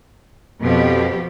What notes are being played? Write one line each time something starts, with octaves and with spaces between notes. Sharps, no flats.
F2 B2 F3 G4